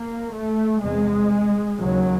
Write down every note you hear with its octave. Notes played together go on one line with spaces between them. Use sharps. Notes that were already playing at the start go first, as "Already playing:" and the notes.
Already playing: A#3
A3
E2 C3 G#3
D#2 C#3 F#3